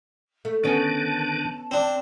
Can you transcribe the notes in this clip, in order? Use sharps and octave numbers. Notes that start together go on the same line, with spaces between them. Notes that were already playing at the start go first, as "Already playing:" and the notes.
A3
D3 D#3 B3 C#4 D4 A5
C4 D4